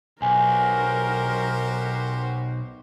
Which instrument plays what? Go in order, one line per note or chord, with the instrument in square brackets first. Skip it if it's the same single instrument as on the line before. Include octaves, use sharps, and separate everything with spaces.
[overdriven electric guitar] B1 [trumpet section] F#4 G4 C5 [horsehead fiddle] A#4 [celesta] G#5